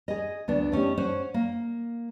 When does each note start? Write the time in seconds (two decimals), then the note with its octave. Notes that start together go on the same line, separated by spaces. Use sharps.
0.08 G#4 D#5
0.48 D2 B3 D4
0.72 A3 C#4 D#4 G4
0.97 C#4 C5 F#5
1.34 A#3